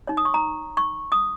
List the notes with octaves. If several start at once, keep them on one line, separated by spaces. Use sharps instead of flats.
D#4 C#5
D#6
C#6
A#5
C#6
D#6